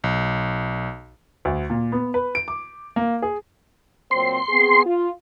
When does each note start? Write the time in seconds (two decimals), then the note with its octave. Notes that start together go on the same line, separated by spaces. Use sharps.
0.04 B1
1.45 D2
1.70 A#2
1.92 B3
2.14 B4
2.35 D7
2.48 D6
2.96 A#3
3.22 G#4
4.11 A#2 F#3 C4 C6
4.49 B3 C4 G#4
4.86 F4